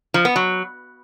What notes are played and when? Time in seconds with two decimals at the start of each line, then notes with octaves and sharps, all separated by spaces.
0.14 F3
0.25 B3
0.36 F#3